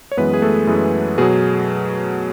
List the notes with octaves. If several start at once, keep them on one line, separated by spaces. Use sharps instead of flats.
C#5
F#2 E3 G#3 B3 B4
G#4
A3 A4
F#2 E3 G#3
B2 F#3 G#4